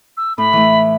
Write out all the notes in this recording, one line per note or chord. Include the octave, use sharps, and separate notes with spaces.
E6
A2 B5
E3 A3